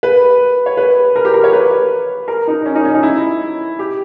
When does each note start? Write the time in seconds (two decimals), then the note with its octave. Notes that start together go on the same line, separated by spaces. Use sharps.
0.03 B4
0.66 C#5
0.77 B4
1.16 A#4
1.25 G4
1.34 A#4
1.44 C#5
1.53 B4
2.28 A#4
2.48 D#4
2.66 C#4
2.75 D#4
2.85 C#4
2.94 D#4
3.03 E4
3.79 G4